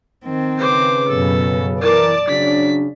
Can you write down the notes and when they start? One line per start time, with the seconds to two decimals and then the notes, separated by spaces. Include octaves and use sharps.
0.25 D#3 C4
0.58 C#3 B4 C5 D6
1.09 F#2 B2 A4
1.82 E3 A#4 D5 A5 D6
2.28 C#3 F#3 D4 B6